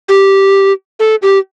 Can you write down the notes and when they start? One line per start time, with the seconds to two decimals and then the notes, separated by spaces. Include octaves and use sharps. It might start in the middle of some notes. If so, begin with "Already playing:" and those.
0.09 G4
1.00 A4
1.22 G4